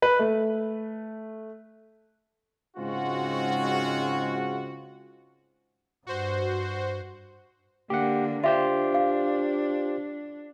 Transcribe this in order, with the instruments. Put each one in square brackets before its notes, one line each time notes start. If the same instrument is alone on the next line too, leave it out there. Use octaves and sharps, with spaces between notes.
[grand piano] B4
A3
[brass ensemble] G#2 C#3 G#3 C4 F4 F#4
[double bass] G2 [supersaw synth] F#4 C5
[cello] D3 A#3 [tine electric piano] G4 F#5
[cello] D4 [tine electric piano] F4 G4 C5 [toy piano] E5
[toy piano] F5